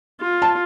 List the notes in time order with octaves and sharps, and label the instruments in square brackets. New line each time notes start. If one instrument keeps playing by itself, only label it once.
[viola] F4
[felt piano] A5